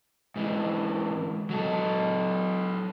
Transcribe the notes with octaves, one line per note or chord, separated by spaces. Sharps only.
G#2 E3
F#3 A4